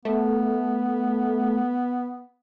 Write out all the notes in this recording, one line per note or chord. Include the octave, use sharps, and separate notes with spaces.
A3 B3